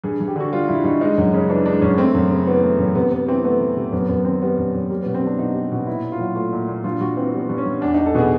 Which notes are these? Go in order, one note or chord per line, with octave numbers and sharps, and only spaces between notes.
G2 G#4
G2
G4
D3 F#4
G3 F4
G2 E4
G2 D#4
G#3 D#4
F#2
C#3
E3 D4
G#3 D4
F#2 C#4
A3 C4
F#2
C#3
E3 B3
A3
F#2
C3 B3
C3 B3
E3 C4
A3 B3
C3
C3
F#2 B3
F#2 B3
D#3 C4
G3 B3
F#2
F#2
G3 A#3
B2 B3
C4
G3 D4
B2 D#4
G3
B2
A#2 E4
A#2
F4
F#3
A3 F4
A#2
A#2
G2 F4
G2 F#4
E3 C4
G3 B3
G2
C#4
G2
E2 D4
D#4
E2
A4
B2 G#4